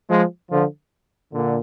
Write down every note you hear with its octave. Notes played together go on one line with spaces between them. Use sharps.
F3 G#3
D3 F3
A#2 D3